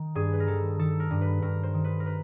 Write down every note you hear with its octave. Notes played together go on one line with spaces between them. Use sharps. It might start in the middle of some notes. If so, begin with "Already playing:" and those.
Already playing: D#3
G2 G#4
B4
A#4
D#3 A4
D#3 A4
A#4
G2
B4
G2 A#4
C5
D#3
B4
A#4
B4